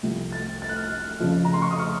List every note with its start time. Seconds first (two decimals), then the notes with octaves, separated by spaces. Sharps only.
0.03 C2 C3 F3 A3
0.33 A6
0.62 A6
0.69 F#6
0.76 F6
0.84 F#6
1.20 F2 C#3 F3
1.45 A#5
1.54 C6
1.62 C#6
1.71 D#6
1.79 F6